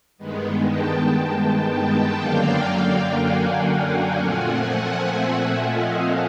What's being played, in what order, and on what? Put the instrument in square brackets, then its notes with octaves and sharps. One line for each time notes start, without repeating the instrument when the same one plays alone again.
[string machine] G2 D#3 G#3 B3
G5 A5
G5 A5
F#2 D3 F#3 A#3 D4 F5 G5
F#5 G#5
A#2 F3 A3 C4
F#5 G#5
E5 F#5
D#5 F5